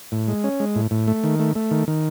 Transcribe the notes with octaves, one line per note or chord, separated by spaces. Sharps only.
A2
G#3
C#4
G#3
A2
A2
A3
D#3
A3
A3
D#3
D#3